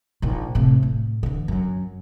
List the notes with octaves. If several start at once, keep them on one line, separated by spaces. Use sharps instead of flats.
A#1 D#3
A2 C3
A2
D3 E3
F#2 D#3